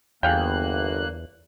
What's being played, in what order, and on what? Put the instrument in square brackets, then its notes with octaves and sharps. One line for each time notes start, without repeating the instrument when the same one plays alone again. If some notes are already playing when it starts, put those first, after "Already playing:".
[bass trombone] G1 [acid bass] E2 [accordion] A#3 F#6 [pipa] G#4 F5 G5